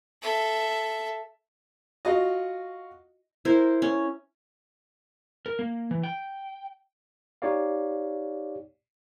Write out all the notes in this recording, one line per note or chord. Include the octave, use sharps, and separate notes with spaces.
A4 E5
F4 F#4 D#5
E4 A#4 C5
C#4
A#4
A#3
E3
G5
D#4 G4 C#5 D5 F5